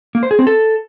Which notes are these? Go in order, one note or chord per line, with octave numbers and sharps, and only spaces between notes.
A#3
C5
G#4
C4
A4